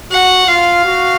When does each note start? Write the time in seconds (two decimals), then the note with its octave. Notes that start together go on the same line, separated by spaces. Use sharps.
0.11 F#4 F#5
0.47 F4 F5
0.84 F#4